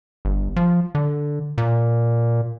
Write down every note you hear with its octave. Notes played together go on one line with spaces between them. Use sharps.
G1
F3
D3
A#2